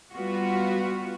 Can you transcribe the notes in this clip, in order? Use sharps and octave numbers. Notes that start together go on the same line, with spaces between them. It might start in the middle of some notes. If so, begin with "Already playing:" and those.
G3 B3 F4 F#4